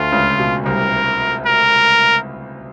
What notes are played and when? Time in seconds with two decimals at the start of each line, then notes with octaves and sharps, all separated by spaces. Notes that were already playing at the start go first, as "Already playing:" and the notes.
Already playing: D2 D3 F4
0.12 C#2 C#3
0.39 B2
0.66 C2 C3 A#4
1.46 A#4